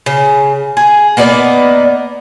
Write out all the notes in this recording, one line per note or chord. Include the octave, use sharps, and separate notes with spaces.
C#3
G#4
A#3 B3 D#4 D5